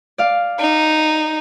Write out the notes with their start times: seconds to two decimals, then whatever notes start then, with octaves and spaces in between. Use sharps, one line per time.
0.18 D5 F5
0.60 D#4